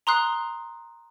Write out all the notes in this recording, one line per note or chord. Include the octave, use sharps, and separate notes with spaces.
A#5 C6 D#6 F#6 C7